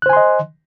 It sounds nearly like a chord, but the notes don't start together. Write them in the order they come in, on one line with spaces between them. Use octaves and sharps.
F#6 C5 G#5 C6 D#5